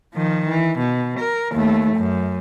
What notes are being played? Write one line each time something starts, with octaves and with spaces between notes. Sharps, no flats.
D#3 F3
E3
B2
A#4
D#2 A3
F#2